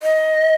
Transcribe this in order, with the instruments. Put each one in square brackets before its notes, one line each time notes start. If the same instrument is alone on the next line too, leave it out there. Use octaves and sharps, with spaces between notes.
[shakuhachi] D#5